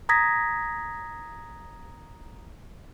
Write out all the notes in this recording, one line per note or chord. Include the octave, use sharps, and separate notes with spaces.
A#5 D#6 G#6 A#6 B6